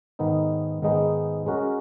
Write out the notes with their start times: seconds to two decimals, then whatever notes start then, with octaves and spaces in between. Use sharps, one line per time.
0.19 G#2 D#3 G#3 B3 D#4
0.82 G#2 D#3 G#3 B3 D#4
1.46 G#3 C#4 F#4 A#4